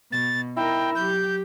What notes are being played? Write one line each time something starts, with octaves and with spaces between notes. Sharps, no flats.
B2 A6
D#4 E4 A#4 G5
F#3 G4 G6